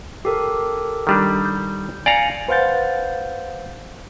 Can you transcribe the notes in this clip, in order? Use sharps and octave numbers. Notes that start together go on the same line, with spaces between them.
G4 A4 A#4
D#3 G3 D4
G6
D5 F5 G#5 A#5 C#7
B4 C5 F5 F#5 G6 A6